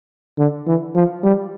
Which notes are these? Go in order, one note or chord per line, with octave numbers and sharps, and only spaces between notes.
D3
E3
F3
G3